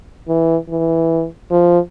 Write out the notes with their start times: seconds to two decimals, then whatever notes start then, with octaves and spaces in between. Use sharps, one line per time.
0.29 E3
0.69 E3
1.51 F3